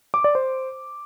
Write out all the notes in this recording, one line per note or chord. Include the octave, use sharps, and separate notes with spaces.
D6
D5
C5